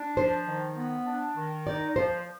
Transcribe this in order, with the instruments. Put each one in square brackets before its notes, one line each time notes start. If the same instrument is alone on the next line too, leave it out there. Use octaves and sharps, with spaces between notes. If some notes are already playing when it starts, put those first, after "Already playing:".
Already playing: [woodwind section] D4
[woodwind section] F3 [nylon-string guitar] C5
[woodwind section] D#3
B3
D4
D#3
[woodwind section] D#4 [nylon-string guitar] D5
[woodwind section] F3 [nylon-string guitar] C5